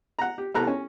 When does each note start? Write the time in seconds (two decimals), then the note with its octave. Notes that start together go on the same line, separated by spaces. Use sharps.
0.19 F#5 A#5
0.38 G4
0.55 C2 B3 A4 A#5 F#6
0.67 C#4